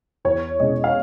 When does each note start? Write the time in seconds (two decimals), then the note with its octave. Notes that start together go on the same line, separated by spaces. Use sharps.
0.25 E2 C#5
0.60 B2 G#3 C#4 D#5
0.84 F5